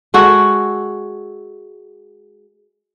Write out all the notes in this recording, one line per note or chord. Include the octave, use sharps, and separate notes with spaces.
G#3 F#4 A4